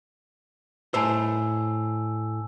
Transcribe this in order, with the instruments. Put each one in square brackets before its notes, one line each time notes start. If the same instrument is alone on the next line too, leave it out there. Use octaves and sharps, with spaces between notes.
[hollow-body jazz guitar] A2 C5 [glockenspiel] G#5 A5 E6